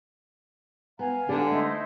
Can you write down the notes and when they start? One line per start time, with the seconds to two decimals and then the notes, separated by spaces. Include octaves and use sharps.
0.99 B3 F5 G#5 A#5
1.29 D3 G4 A4 D5
1.51 A3 D#4 E4 C5